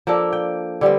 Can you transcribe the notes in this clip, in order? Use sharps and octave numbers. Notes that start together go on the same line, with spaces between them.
F3 A#3 D4 A4
G5
D3 G3 B3 C4